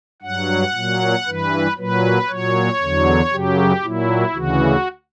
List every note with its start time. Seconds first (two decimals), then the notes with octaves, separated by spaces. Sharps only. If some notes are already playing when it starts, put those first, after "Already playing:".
0.22 G2 F#3 F#5
0.73 A#2 F#3
1.26 G2 E3 B4
1.77 A#2 F#3 B4
2.28 A#2 F#3 C#5
2.80 E2 D3 F#3
3.31 F#2 C#3 F#3 G4
3.83 A#2 F#3 E4
4.34 D2 C#3 E3 F#4